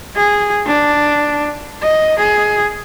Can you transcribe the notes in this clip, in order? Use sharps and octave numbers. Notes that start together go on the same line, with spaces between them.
G#4
D4
D#5
G#4